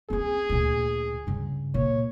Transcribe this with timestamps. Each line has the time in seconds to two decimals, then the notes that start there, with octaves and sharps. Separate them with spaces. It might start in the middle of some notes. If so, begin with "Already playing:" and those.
0.10 C4 C#4 G#4
0.49 D2 A#2
1.27 G2 C#3
1.74 A#2 C#5